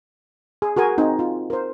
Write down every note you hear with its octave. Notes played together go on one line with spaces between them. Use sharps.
G#4
F#4 G#4 A#4 G#5
C4 D#4 C5
F4
A#4 C5